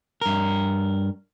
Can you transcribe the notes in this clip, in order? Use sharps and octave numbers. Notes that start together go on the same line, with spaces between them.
G2 A#4